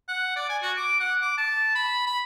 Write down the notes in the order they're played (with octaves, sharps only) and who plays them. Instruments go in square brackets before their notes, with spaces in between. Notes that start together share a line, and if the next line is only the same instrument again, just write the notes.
[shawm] F#5
D5
G#5
F#4
D6
F#5
D6
A5
B5
B5